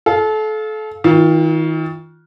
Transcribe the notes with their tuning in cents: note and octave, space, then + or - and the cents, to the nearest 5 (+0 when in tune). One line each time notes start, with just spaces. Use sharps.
A4 -30 F5 +0
D#3 +40 F4 +0